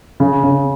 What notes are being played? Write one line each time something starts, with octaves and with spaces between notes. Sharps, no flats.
C#3
C#3